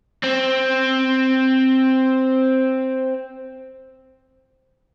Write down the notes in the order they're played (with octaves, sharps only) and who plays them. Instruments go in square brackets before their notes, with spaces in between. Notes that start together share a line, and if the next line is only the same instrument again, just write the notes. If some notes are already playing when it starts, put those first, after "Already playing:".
[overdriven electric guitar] C4